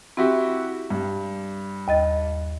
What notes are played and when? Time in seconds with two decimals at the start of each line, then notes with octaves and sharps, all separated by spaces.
0.17 C4 E4 F#4 G4
0.90 G2
1.88 D#2 D#5 A6